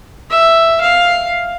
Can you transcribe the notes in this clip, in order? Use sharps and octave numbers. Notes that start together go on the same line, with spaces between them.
E5
F5